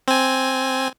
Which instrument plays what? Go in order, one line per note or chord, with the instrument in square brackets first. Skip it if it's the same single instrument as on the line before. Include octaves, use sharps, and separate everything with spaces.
[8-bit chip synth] C4 G#5